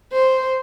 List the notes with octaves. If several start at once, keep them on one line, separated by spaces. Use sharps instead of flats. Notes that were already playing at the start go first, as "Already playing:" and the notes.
C5